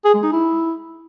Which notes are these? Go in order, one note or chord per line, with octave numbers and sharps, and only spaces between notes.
G#4
G#3
D#4
E4